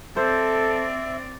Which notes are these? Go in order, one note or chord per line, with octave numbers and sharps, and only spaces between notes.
C4 A4 C5 D5 E5